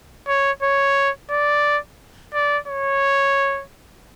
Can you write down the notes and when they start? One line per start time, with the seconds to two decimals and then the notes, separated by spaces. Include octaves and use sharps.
0.28 C#5
0.63 C#5
1.31 D5
2.34 D5
2.68 C#5